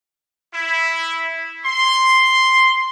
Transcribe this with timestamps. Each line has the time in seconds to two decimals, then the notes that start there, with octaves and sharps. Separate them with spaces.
0.54 E4
1.65 C6